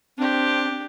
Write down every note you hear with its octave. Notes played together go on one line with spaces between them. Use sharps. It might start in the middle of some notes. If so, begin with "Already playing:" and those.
C4 D4 G4